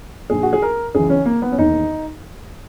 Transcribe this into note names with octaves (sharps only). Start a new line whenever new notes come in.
A#1 A#2 G#4
F#4
G#4
A#4
C#2 C#3 E3 G#4
C#4
A#3
B3
C#4
E1 D#2 D#3 D#4